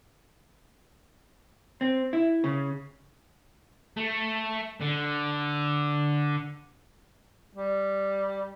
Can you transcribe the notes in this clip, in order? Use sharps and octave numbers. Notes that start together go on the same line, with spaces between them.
C4
E4
C#3
A3
D3
G3